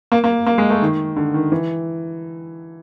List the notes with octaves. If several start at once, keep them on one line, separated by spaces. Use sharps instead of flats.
A#3
A#3
A#3
G#3
A3
D#3
D3
D#3
E3